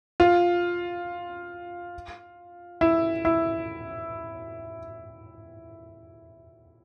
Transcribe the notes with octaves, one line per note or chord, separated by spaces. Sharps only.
F4
E4
E4